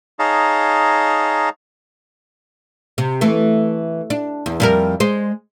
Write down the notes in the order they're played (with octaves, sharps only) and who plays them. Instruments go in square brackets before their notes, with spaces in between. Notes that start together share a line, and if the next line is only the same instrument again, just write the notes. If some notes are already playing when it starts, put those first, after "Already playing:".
[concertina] D#4 G#4 C#5 F5 A5 A#5
[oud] C3
E3 A3
D4
E2
F2 G3 A#4
G#3 C5